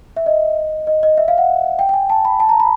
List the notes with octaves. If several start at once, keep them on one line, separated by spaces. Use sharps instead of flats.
E5
D#5
D#5
D#5
E5
F5
F#5
G5
G5
G#5
A5
B5
A5
A#5
B5